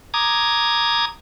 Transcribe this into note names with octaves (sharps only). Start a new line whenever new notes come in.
A#5 D6 D#6 G#6